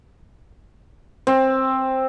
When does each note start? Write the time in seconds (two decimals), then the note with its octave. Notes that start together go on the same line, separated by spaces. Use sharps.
1.27 C4